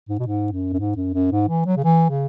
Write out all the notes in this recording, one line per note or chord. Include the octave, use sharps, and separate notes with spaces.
G#2
B2
G#2
F#2
F#2
G#2
F#2
F#2
G#2
E3
F#3
C#3
E3
C#3